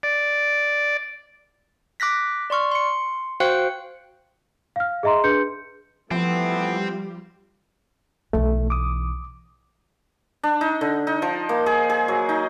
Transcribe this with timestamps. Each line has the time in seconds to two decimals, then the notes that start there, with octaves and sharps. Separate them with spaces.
0.03 D5
2.00 D6 F#6 A#6 B6
2.50 D5 C6 C#6 F6
2.71 C6 C#7
3.40 F#4 C5 F5 G5 F#6 C#7
4.76 F5 F6
5.03 G#4 D#5 E5 A#5 C6
5.24 D4 G#4 B4 C6 G6 C#7
6.11 E3 F3 G3 A3 B3 C4 F4 G4
8.33 B1 E3 A3
8.70 D6 D#6
10.43 D4
10.61 D#4
10.81 D3
11.07 D#4
11.22 F3
11.49 A#3
11.66 G#4
11.90 G#4
12.08 F#3
12.29 D#4